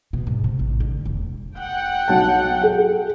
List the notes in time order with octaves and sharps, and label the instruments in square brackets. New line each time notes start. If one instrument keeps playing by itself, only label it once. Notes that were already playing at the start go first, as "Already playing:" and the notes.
[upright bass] B2
G#2
C3
A1
D3
E1
[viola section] F#5 G5
[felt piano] B1 A5
G#4 A4 F#5